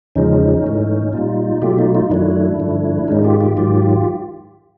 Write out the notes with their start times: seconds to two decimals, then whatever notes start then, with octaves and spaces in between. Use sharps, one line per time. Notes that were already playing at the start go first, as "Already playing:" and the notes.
0.15 E2 C#3 F3 G#3 C#4 D#4
0.64 G#2 E3 A3
1.13 A#2 G3 D#4 F4
1.62 B2 F#3 A3 F4 G4
1.78 D#4 F4
1.95 D#4 F4
2.10 F#2 D#3 F#3 A3 D4 E4
2.59 G2 D3 F3 A3
3.08 G#2 D#3 G#3 C#4 D#4
3.24 F4 G4
3.41 F4 G4
3.57 G#2 D#3 F#3 F4 G4